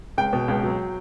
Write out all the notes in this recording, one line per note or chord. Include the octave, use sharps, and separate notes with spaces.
C#2 G5
B2
C#2
F#3